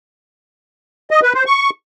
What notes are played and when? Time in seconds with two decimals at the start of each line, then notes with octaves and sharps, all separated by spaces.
1.11 D#5
1.23 B4
1.34 C5
1.46 C#6